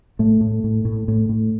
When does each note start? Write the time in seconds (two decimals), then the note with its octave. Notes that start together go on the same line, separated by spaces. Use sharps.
0.19 A2 A3
0.41 A2
0.64 A2
0.85 A2
1.08 A2
1.29 A2